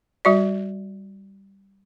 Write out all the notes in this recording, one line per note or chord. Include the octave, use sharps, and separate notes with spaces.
G3 F#4 D5